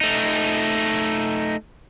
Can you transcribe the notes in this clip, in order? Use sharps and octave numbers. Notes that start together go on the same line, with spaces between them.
A3 D#4